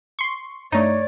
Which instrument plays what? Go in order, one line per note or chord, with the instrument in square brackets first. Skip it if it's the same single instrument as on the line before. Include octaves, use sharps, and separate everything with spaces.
[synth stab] C6 C#6
[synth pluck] G2 A3 [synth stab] D#4 [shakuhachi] C#5 [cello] D5